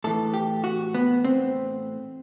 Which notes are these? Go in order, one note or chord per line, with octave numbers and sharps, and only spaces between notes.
A2 E3 A4
G4
F#4
B3
C4